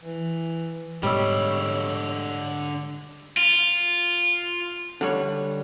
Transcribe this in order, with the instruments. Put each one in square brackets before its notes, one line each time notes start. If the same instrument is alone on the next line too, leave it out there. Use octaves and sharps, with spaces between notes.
[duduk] E3
[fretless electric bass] G#2 B2 [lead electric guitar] D3 C#5 [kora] G3 [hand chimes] D#5 E6
[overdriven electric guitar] F4
[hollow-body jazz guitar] D3 G3 C#5